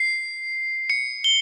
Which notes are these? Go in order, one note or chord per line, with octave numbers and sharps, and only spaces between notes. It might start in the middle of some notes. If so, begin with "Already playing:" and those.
Already playing: C7
C#7
G7